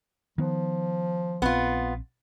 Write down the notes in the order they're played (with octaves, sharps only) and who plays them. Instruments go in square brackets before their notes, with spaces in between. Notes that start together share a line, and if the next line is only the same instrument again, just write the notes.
[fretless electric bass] D#3 B3 [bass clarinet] F3
[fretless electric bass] A#1 C4 [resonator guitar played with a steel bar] B3 F4